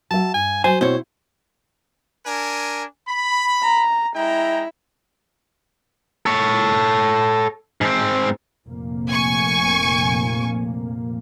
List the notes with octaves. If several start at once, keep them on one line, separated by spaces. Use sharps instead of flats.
F#3 E5 A5
G2 G#5
F#3 C5 G#5
B2 C4 E4 C5 C#5
D4 A#4 G#5
B5
A#5
G#3 E4 G5 A#5
A4 C#5
G#2 C4
F1 A#2 A#3
G#5 C#6